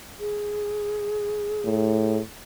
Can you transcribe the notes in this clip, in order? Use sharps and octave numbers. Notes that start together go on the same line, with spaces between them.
G#4
A2